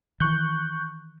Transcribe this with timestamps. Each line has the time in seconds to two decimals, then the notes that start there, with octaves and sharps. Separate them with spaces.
0.20 D#3 E3 C#6 F#6 G6